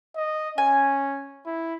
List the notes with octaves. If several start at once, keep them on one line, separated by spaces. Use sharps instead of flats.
D#5
C#4 G#5
E4